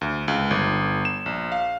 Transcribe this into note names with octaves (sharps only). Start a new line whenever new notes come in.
D2
C#2
G1
E7
A#1
F5